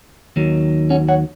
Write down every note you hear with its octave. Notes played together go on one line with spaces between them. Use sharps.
D#2 D#3 F#3
C#4 F#4
C#5 F#5